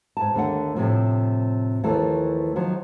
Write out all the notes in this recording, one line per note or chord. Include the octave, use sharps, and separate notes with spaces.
G#2 A5
D#2 D3 A3 F#5
A2 C3 F3
D#2 E3 F3 A3 A4
D#3 F3 F#3